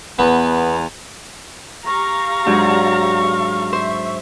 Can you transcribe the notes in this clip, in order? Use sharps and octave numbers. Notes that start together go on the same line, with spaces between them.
E2 B3
G4 F5 A#5 C#6
G#2 F#3 D4
C5 E5